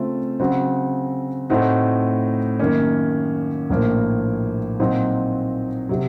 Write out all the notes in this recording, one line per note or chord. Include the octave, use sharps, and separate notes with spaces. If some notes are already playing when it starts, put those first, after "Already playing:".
Already playing: C#3 A3 C4 F4
C#3 F#3 C4 F#4
A2 A3 C4 D#4 F#4
F#2 D#3 A#3 C#4
A#1 A2 F3 A#3
A#2 F#3 C4 D#4 F#4
C3 F#3